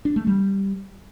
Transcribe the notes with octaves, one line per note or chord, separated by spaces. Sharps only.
D4
A3
G3